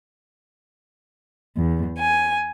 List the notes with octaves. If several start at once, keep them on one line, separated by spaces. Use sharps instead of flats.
E2
G#5